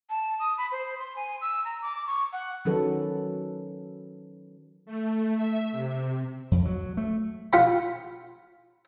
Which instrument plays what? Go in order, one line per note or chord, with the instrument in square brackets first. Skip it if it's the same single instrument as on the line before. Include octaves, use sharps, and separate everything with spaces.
[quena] A5
D#6
B5
C5
C6
G#5
E6
A#5
D6
C#6
F#5
[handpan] D#3 F#3 C#4 A4 B4
[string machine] A3
E5
C3
[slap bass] F2
F#3
A3
[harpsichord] F4 F#5 B5